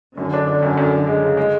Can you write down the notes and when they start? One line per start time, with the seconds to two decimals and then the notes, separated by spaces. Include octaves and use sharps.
0.18 F#2 D3
0.33 D4
0.47 D4
0.63 F#2
0.78 F#2
0.93 F#2
1.07 G#3
1.22 C#3
1.37 G#3